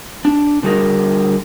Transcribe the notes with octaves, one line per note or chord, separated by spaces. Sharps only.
D4
D3 G3 F#4 G#4 A#4